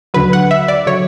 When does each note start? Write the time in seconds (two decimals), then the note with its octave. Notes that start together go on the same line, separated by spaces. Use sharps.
0.14 D2 D3 F#3 B4
0.33 F#5
0.51 E5
0.68 D5
0.87 D3 F#3 C#5